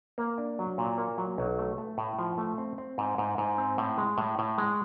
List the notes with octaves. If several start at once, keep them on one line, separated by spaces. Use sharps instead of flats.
A#3
D4
F#3
A#2
A#3
F#3
B1
A3
A3
A2
F3
A3
C4
C4
G#2
G#2
G#2
C4
A2
G#3
A2
A2
G#3